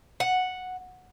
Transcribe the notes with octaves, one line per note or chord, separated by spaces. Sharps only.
F#5